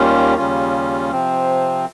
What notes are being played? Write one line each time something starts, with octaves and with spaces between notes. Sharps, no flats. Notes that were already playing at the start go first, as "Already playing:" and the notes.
Already playing: D#2 D#3 G3 C#4 F4
D#2 C#3 G3 C#4 F4
C3 F3 C4